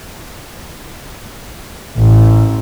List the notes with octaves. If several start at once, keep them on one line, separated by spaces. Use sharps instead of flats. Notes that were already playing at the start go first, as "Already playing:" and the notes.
A1